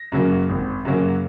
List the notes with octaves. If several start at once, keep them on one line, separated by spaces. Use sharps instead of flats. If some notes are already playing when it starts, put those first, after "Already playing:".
Already playing: A#6
F#2 C#3 F#3 A#3
G#1
F#2 C#3 F#3 A#3